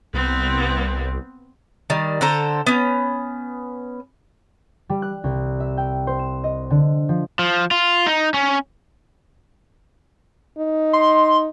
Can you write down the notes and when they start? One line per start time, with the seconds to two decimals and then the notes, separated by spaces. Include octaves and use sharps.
0.14 C2 B3 C4
1.90 D#3 G3
2.21 D3 A4 C5 A#5
2.67 B3 C#4
4.89 G3
5.02 F#6
5.24 C2
5.60 E5
5.77 G5
6.07 C5
6.19 E7
6.44 D#5
6.70 D3
7.09 F3
7.39 F3
7.71 F4
8.07 D#4
8.34 C#4
10.58 D#4
10.93 C6